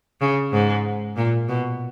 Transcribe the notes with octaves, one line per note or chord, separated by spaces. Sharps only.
C#3
G#2
A#2
B2